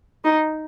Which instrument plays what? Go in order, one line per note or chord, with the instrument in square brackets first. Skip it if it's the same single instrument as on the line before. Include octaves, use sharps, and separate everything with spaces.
[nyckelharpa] D#4